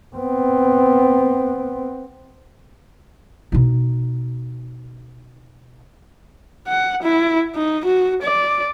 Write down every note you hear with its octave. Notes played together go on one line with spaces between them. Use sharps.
B3 C4
B2 D#4
F#5
E4
D#4
F#4
D5